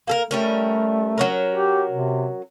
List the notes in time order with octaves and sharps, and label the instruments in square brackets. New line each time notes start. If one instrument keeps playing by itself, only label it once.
[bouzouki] A#3 A4 A#4
[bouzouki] G3 C#4 A#4 [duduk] A3
[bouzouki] F#3 C#4 A#4
[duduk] G4
C3